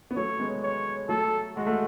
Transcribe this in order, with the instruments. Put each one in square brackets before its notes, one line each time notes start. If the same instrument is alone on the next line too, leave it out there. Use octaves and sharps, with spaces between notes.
[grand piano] B3
[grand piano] F#3 A3 [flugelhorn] C#5
[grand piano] G#3 B3
[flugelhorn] C#5
[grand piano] F#3 A3 [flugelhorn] A4
[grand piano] G#3 [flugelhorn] F#4
[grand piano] A3